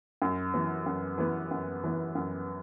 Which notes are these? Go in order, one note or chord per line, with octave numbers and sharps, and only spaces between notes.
F#2
E3 B3
F#2
E3 B3
F#2
E3 B3
F#2